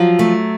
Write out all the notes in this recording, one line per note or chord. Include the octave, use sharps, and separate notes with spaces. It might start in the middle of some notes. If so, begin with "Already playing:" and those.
Already playing: F3 F#3
A3